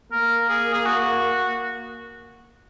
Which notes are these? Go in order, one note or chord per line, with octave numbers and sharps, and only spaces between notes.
A#3 A#4
G#4
G#4
F#4